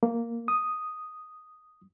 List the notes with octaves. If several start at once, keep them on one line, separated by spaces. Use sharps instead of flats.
A#3
D#6